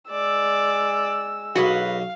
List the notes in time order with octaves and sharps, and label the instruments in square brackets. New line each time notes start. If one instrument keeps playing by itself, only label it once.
[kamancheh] G#3 E6 [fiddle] D5
[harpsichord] B1 F#3 [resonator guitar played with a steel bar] F#4 G#4 B4 [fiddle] F5